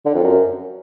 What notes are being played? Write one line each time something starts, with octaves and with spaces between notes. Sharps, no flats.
D3
F2
F#2